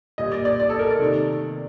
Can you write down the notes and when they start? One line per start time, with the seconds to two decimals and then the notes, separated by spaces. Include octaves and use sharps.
0.18 A#2 G3 D#5
0.32 D5
0.45 D5
0.60 D5
0.69 A4
0.79 A#4
0.90 D5
0.99 C3 D#3 A3